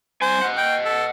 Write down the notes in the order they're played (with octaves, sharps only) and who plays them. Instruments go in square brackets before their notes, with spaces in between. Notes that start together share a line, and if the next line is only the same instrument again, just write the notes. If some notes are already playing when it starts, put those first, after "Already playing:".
[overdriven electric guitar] C2 G#5 [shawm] C5
[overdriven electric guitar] D#5 F#5
[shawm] G5
A4